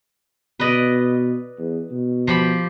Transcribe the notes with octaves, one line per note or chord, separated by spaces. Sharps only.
B2 B4 D5 D#5
E2
B2
F3 G4 B5